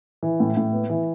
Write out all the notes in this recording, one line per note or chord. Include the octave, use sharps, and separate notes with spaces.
E3
A2
A2
B3
E3